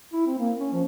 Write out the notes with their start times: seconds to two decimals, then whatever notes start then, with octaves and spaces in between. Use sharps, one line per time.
0.13 E4
0.27 C4
0.39 A#3
0.60 C#4
0.73 F3